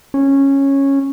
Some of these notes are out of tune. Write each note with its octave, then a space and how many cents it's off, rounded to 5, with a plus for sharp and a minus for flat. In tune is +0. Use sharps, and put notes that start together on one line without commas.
C#4 -10